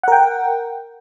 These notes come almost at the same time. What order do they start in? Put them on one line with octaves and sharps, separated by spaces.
F#5 A#4 G5